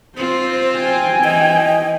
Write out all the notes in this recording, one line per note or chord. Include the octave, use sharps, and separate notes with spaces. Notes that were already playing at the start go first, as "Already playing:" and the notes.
C4 F4 C5
G5 G#5
E3 D#5